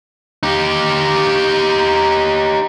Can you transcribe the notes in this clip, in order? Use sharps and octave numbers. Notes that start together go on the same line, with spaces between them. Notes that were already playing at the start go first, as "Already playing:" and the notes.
D#4 G4